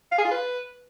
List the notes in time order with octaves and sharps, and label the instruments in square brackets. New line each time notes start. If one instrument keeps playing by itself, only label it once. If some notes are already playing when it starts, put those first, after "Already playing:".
[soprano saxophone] F5
G#4
F4
B4